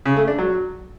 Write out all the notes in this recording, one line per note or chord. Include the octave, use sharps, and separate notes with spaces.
C#3
A3
D4
F#3